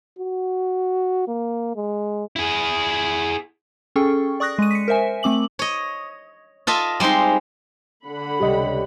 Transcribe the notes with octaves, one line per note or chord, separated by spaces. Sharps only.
F#4
A#3
G#3
E4 G#4
C#4 G#4 A4 G5 C#6
D5 C#6 D#6 F#6 A#6
G#3 D#7
B6 C#7
A#4 C5 E5 G#5
A3 C4 D6 F#7
C#5 D#5
F4 A4 D#5 E5
G3 G#3 C4 D#4 C6
D3 F#5 B5
C#2 C3 G3 G4 D#5